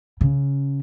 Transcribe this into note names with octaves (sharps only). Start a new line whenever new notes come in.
C#3